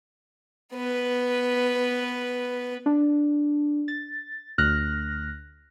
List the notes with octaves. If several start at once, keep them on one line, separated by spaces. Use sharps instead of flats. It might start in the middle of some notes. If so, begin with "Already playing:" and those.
B3 B4
D4
A6
D2 F6 F#6 A#6